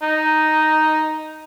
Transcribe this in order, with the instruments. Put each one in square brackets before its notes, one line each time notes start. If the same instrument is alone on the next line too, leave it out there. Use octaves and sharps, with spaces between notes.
[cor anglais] D#4